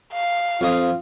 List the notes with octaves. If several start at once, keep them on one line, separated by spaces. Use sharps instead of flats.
F5
F2 F4 D#6